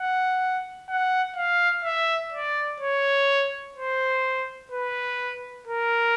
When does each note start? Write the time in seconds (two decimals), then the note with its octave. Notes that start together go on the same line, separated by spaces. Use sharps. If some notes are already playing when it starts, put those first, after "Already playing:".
Already playing: F#5
0.89 F#5
1.36 F5
1.84 E5
2.32 D5
2.80 C#5
3.76 C5
4.72 B4
5.68 A#4